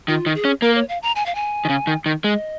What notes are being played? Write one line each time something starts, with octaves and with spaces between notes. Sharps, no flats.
D#3 F4
D#3
G#4
C#4
A#3 A#4
C#5
F5
A#5
G#5
F5
G#5
D#3
C#3
D#3
D#3
G#3 D#5